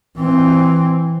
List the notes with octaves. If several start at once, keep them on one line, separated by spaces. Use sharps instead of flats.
E3 C4